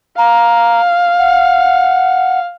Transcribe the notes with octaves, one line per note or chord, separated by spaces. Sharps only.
F5 A#5
F#5